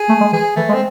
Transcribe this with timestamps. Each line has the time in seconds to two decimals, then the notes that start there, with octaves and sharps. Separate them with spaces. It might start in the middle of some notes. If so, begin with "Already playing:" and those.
Already playing: G#4
0.09 A3
0.21 G#3
0.32 E3 G#4
0.56 E3 A3
0.69 G#3
0.73 C4